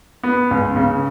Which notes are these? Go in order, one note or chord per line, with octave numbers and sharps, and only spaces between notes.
B3
C#2
C#3